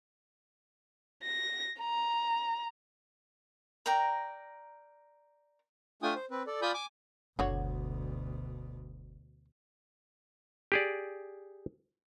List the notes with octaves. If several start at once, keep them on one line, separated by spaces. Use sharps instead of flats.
A#6
A#5
A#4 D5 G5 A#5
A3 D4 F4 G5 G#5 D#6
C5
C4 B4
A4 D5
F4 D5 G#5 B5 D#6 G6
G#5 D6
F#1 D2 B2 D3 F#4 C#5
G4 G#4 D5